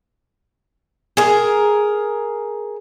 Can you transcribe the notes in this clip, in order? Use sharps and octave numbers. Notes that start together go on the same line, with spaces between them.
G#4 A#4